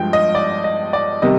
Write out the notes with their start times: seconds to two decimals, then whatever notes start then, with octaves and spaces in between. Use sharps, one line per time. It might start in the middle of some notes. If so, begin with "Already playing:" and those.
Already playing: G2 F3 G#3 G5
0.13 D#5
0.35 D5
0.64 D#5
0.93 D5
1.22 C3 D#3 G3 D#5